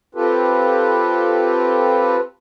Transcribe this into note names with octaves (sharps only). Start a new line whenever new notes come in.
C4 F4 G4 A4 B4